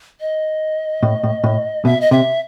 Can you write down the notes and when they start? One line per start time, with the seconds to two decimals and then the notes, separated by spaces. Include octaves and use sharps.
0.21 D#5
1.03 A2
1.23 A2
1.44 A2
1.85 B2 E5
2.01 D#5
2.11 C3 E5